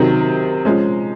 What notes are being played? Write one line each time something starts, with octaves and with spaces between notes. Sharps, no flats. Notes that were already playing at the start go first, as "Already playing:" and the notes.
Already playing: C3 D#3 F#3
F3 G#3 C#4